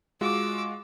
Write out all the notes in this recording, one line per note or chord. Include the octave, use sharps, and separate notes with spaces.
G#3 F4 F#4 D6 E6